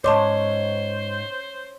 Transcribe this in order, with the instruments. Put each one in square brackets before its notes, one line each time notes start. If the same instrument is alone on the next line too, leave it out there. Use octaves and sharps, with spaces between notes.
[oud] G#2 [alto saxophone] C5 [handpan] C#5 [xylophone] A5 C6 D6